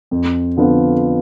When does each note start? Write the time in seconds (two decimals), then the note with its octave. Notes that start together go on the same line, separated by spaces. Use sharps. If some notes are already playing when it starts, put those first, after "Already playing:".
0.11 F2
0.57 D3 F3 B3 F4